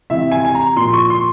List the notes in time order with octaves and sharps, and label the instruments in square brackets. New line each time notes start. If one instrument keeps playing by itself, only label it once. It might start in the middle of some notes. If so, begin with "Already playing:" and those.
[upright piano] C3 E3 E5
G#5
G#5
A#5
A#2 F3 C6
C#6
C6